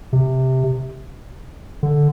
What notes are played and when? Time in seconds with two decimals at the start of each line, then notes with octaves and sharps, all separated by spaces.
0.13 C3
1.83 D3